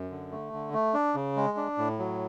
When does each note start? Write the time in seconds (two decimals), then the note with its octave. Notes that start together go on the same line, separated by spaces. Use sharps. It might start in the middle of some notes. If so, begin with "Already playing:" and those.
Already playing: F#2
0.11 D3
0.32 A3
0.53 D3
0.73 A3
0.94 D4
1.15 C#3
1.36 G#3
1.57 D4
1.78 A2
1.99 F#3